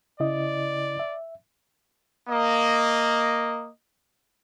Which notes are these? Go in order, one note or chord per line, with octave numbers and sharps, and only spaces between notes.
C#3 E4 D5 D#5
E5
A#3 D#5